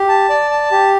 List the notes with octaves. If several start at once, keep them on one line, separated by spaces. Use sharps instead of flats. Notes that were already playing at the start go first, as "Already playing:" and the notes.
Already playing: G4
A5
D5
A5
G4